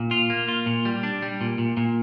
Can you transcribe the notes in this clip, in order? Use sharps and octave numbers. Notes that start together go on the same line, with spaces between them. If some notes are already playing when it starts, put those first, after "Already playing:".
Already playing: A#2
F4
A#3
F4
A#2
G3
D4
G3
A#2
A#2
A#2